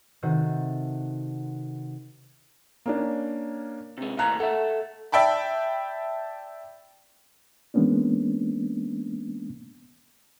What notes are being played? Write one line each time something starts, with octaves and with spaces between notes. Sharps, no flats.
C3 D#3 F#4 A4
A#3 C#4 D4
C3 G#3
D#2 A2 F5 A#5 F#6 G#6
A4 E5 F#5
D5 E5 G5 A5 B5
E3 G#3 A#3 B3 C#4 D4